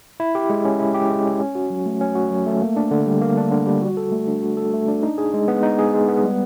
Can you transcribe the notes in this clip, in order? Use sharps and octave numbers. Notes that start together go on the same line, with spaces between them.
E4
G4
G#3
C#4
E4
G4
G#3
C#4
C#4
F#4
F#3
A3
C#4
F#4
F#3
A3
A#3
D4
D3
G3
A#3
D4
D3
G3
F#4
A4
A3
D4
F#4
A4
A3
D4
D#4
G#4
G#3
B3
D#4
G#4
G#3
B3
G3